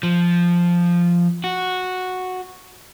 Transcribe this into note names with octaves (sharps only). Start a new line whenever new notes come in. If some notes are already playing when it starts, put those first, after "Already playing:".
F3
F#4